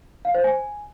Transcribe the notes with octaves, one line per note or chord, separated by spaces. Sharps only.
F5
C5
G#5